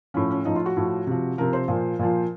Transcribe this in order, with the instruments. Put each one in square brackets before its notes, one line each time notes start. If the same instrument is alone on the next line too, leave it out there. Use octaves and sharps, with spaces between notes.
[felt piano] A2 F3 C#4
C#4
A2 F3 D#4
F4
F#4
A2 F3
C3 F3
C3 F3 A#4
C5
A#2 F3
A#2 F3